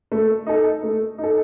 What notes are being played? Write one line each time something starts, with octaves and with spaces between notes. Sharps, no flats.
A3
D#4 A4
A3
D#4
A4